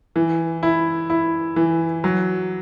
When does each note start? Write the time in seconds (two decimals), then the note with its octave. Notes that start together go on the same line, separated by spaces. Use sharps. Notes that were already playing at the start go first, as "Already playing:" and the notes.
0.16 E3
0.63 E4
1.10 E4
1.56 E3
2.04 F#3